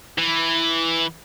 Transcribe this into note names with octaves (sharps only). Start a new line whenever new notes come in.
E3